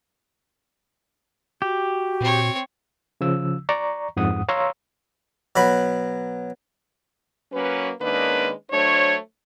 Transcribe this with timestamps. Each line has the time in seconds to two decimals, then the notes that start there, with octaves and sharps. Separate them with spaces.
1.62 F#4 G4
2.21 A#2 C4 C#5
3.21 C#3 F3 E6
3.69 D5 A#5 C#6
4.17 F2 G#2 F#5 D#6
4.49 C#5 F5 A#5 C6 C#6 E6
5.56 B2 F#3 B5
7.52 F#3 A#3 C#4 B4
8.01 D#3 G#3 A#3 C#4 D4 B4
8.71 F#3 A3 D4 C5 C#5